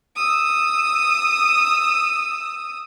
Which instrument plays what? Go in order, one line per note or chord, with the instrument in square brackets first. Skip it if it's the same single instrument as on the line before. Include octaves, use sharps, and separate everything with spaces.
[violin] D#6 E6